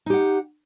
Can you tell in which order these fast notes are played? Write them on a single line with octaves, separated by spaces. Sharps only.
D#4 G4 F#5